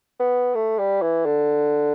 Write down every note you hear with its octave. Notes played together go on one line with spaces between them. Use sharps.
B3
A3
G3
E3
D3